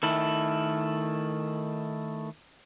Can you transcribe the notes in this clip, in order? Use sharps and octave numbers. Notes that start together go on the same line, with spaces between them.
D#3 A3 E4